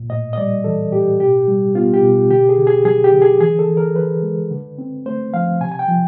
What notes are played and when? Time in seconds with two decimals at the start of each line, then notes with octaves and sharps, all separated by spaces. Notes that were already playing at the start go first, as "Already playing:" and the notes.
Already playing: A#2
0.10 A2 D#5
0.33 D#5
0.38 G3 D5
0.64 E3 A4
0.92 A2 G4
1.20 B2 G4
1.48 G3
1.75 B3 F4
1.94 G4
2.03 B2
2.30 D3 G4
2.49 G#4
2.58 D3
2.67 G#4
2.85 F#3 G#4
3.04 G4
3.12 D3
3.22 G#4
3.41 E3 G#4
3.59 A4
3.68 E3
3.77 A#4
3.96 E3 B4
4.23 G#3
4.51 D3
4.78 C4
5.06 A3 C5
5.34 F3 F5
5.61 C3 G#5
5.72 G#5
5.79 G5
5.88 F3